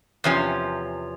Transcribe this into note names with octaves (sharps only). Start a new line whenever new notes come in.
E2 C3 F3 C#4